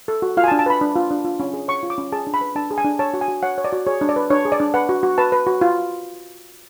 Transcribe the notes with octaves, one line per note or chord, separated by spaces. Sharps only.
A4
F#4
F4 F5
G#5
A5
D4
A5
B4 B5
D4
F4
D4
F4
C#4
G#4
C#5 C#6
F4
D6
C#4
G#4 A5
D4
B5
B4
D4 A5
G#4
G#5
D4
C#5 A5
F#4
G#5
F#4
C#5 F#5
C#5
D5
F#4
G#4 C#5
D4
D5
B4
D4 C#5
G#4
D5
D4
B4 F#5
F#4
F#4
B4 A5
B4
F#4
F4